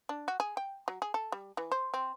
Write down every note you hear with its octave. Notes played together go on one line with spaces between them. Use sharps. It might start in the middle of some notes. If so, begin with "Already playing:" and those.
D4
F#4
G#4
G5
F#3
G#4
A4
G3
E3
C5
C4